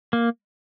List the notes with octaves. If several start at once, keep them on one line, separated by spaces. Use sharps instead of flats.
A#3